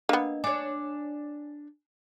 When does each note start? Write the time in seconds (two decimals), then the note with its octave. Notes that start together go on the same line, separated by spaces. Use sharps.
0.09 A#3 B3 D4 D#5
0.44 D4 C#5 G#5